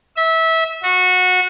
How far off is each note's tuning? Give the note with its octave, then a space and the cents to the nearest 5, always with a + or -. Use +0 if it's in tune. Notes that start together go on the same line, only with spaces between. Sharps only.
E5 -20
F#4 -20